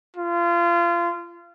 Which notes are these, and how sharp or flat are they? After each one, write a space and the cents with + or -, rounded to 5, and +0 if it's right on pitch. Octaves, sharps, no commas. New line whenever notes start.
F4 -25